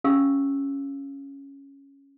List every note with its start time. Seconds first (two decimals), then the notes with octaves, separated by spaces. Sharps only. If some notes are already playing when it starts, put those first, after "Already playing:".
0.04 C#4 G4 F5 E6